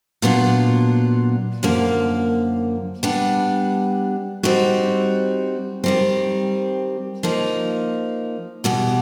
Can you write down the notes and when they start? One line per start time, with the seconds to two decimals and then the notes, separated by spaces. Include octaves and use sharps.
0.22 A#2 F#3 B3 D4 F4
1.63 F#2 D3 F3 A#3
3.03 G3 B3 D4
4.43 G3 C4 D#4 F#4
5.84 D#3 G3 C4
7.23 F3 A#3 D#4
8.64 E2 B2 G3